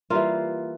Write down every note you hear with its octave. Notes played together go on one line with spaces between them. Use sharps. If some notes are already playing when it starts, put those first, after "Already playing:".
E3 G3 A#3 F4